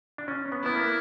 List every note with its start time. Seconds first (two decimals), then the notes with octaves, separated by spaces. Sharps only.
0.18 D4
0.28 C#4
0.52 B3
0.64 B3 E4
0.75 A#3